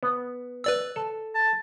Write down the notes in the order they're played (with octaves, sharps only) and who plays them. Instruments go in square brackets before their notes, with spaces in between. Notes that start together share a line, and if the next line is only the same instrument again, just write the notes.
[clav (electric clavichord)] B3
[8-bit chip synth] B4 D5 E6
[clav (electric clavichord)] A4
[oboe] A5